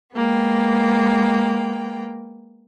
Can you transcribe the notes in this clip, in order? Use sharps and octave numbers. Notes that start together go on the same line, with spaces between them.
G#3 A#3 B3 G5